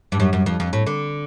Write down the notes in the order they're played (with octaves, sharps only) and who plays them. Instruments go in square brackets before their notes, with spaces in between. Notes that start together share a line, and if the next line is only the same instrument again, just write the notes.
[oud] G2
F#2
F#2
F2
F2
A2
D3